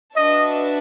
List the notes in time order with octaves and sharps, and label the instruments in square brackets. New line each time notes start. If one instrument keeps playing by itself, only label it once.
[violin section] D4 F#4 B4 E5 A5 [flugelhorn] D#5